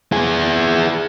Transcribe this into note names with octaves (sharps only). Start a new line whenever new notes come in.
E4 G#4